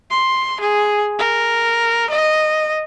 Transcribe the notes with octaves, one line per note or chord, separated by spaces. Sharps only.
C6
G#4
A#4
D#5